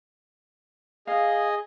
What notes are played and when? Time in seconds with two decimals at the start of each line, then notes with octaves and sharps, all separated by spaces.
1.07 G#4 D#5 F5